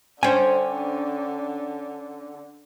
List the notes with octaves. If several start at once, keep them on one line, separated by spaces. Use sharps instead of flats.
D3 C#4 D4 C5 G5 G#5